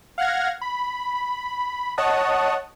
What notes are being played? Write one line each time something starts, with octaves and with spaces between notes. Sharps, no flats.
F5 F#5 F6 G#6 A#6
B5
C#5 D#5 F#5 A5 D#6